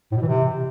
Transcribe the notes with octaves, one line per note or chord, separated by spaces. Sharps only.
A2
B2
E3
C3